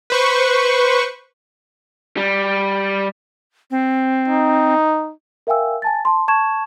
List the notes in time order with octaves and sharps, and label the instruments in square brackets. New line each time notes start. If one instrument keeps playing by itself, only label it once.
[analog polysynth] B4 C5 C#6
[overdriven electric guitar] G3
[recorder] C4
[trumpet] D#4
[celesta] A#4 E5 F5 G5 G#5 E6
G#5 A5 A6
A5 C6
A5 C#6 G#6 E7